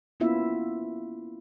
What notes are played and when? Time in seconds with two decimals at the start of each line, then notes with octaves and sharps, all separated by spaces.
0.20 A#3 B3 C#4 E4 F4 E5